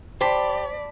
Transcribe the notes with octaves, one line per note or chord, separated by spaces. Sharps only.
G4 C5 D5 A5 B5